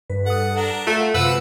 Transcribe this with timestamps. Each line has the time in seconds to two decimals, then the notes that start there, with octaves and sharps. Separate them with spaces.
0.10 G2 B4
0.26 A4 F#5 D#6
0.56 D4 A#4 F#5
0.87 A3 F4
1.14 F#2 C3 G#3 B4 F#5 E6